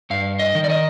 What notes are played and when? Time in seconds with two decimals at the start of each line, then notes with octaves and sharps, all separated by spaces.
0.10 G2 F5
0.39 D#5
0.55 D#3
0.64 D5
0.70 D#5